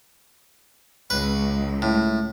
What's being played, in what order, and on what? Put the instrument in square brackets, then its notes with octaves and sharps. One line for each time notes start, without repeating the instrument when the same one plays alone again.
[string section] C#2 [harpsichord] B4
[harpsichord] A2